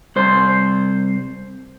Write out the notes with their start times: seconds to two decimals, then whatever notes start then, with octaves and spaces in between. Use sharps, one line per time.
0.16 C2 C5